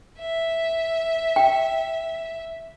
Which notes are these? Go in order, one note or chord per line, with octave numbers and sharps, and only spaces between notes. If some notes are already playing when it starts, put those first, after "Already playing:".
E5
G5